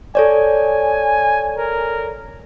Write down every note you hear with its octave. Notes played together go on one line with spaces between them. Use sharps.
A4 C#5 D5 G#5
A#4